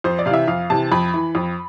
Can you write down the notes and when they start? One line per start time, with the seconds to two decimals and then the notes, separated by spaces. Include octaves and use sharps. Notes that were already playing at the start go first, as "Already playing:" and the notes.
0.04 F2 C5
0.19 D5
0.26 C3 F5
0.30 E3 E5
0.48 F2 F5
0.70 C3 E3 A5
0.92 F2 B5
1.14 E3
1.35 F2